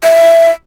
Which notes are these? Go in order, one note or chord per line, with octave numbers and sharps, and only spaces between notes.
E5